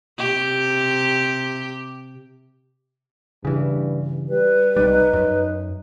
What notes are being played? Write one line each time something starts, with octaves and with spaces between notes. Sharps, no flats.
C3 G4
G2 C#3 E3
G3 B4
C2 G3 D#4
F#2